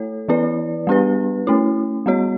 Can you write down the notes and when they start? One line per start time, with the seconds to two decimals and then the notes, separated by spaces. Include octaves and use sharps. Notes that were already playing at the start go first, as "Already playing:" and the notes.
Already playing: A3 E4 A4 C#5
0.28 E3 B3 E4 B4 D5
0.87 G3 B3 D4 G4 B4
1.47 A3 C#4 E4
2.06 G3 B3 F#4 C#5